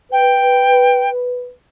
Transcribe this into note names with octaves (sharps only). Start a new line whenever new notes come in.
B4 G5